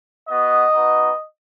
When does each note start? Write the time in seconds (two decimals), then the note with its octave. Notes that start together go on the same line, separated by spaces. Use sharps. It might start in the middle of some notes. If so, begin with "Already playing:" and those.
0.29 B3 F#4 D#5
0.74 B3 D#4 F#4